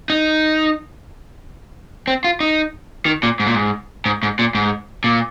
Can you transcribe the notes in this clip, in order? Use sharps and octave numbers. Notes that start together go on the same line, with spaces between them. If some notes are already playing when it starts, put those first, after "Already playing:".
D#4
C4
F4
D#4
D#3
A#2
G#2
A#2
G#2
G#2
G#2
A#2
G#2
A#2